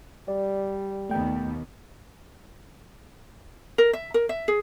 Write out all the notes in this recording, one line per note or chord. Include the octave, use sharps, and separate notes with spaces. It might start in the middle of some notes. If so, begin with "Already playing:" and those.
G3 D5
D#2 B2 A3 B3 G5
A#4
E5
A#4
E5
G#4